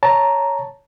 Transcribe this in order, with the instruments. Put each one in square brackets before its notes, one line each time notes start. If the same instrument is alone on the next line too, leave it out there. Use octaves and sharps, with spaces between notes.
[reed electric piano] C#5 A5 A#5